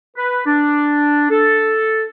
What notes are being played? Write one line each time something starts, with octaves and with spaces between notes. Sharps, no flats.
B4
D4
A4